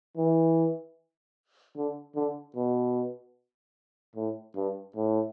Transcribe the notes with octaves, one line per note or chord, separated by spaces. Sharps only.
E3
D3
D3
B2
A2
G2
A2